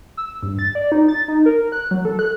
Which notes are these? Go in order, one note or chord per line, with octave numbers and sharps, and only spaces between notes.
E6
G2
A6
D5
D#4
A6
D#4
A#4
F#6
F#3
A4
F#6